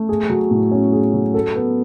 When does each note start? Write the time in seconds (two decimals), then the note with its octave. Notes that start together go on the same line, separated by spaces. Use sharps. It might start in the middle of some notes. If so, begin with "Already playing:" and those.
Already playing: A3
0.09 G#4
0.30 F#3
0.51 A2
0.72 C#4
0.93 G#4
1.14 F#3
1.34 A4
1.55 B3